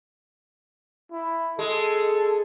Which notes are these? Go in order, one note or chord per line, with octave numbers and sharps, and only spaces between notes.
E4
G#3 A4